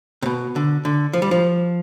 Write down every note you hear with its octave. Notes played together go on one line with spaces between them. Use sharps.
C3
B2
D3
D3
F3
G3
F3